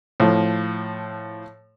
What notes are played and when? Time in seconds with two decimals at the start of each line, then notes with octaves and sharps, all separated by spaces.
0.20 A2 F3